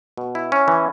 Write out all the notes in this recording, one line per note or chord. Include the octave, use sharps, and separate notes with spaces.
B2
E4
C#4
E3